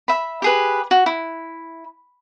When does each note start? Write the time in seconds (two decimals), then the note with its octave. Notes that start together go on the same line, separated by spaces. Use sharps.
0.08 E5 B5
0.42 G4 G#4 B4
0.91 F#4
1.06 E4